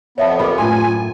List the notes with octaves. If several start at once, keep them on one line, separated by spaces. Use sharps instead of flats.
F2 B3 C#5 E5 A5
G4 A#4 D5 B5 D6
F#2 A2 F4 G#5 C6